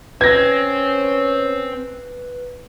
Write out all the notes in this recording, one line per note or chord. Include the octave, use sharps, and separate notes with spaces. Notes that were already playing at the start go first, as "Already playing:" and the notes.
C4 C#4 B4 G#6 A#6